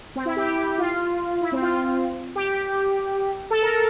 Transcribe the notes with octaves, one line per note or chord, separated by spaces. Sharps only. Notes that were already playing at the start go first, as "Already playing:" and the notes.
C4
E4
G4
G4
F4
E4
C4
F4
G4
A4
A#4